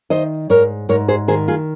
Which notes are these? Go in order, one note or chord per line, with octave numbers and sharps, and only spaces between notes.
D#3 C5 D#5
G#2 A#4 C#5
G#2 A#4 C#5
G#4 C5
D#3 G#4 C5
F4 G#4